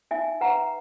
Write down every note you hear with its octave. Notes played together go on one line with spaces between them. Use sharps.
D#4 E5 G#5
B4 F#5 A#5